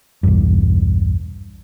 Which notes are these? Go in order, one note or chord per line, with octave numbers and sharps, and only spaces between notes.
B1 E2 G2